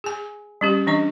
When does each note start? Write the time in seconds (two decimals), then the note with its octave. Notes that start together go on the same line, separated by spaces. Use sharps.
0.04 G#4 G#5
0.61 G3 C#4 G4
0.87 E3 D4 D#5